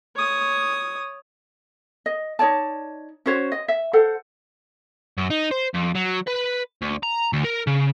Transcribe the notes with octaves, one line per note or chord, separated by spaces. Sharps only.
C#5 D#6
D#5
D#4 C#5 D5 A5
C#4 F#4 C5 C#5
D#5
E5
A4 C5 F#5
F#2
D#4
C5
F2
F#3
B4
D2
A#5
D2
A#4
C#3